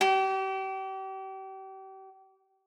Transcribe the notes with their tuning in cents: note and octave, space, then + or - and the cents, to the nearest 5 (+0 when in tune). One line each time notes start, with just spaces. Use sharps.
G4 -35